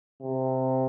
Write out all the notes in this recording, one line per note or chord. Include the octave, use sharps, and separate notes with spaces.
C3